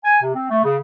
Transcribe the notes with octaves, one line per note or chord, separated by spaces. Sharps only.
G#5
C3
C4
A3
C#3